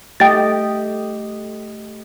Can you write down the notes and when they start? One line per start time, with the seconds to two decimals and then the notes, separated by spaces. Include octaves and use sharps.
0.20 A3 G4 D#5 G5 A6